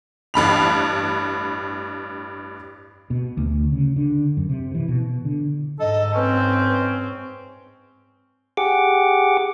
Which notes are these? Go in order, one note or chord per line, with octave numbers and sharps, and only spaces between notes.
A1 G2 B5 F7
B2
D2
C#3
D3
F#2
C3
E3
B2
D3
G#2 A4 D#5
C4 C#4 B4
G4 G#4 F#5 D6